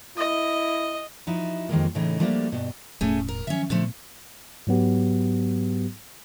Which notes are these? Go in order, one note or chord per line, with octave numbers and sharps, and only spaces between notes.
E4 D#5
F3 D#4 E4 F#4
F2 D#3 G#3 A#3
A2 C#3 E3 A3 D#4
F3 G3 A3 A#3 D4 F#4
G2 B2
E1 E2 A2 A3 C#4 G#4
A#4
D#3 F3 F#3 C#4 E5
A#2 D3 F3 A3 B3
G#2 F#3 B3 G4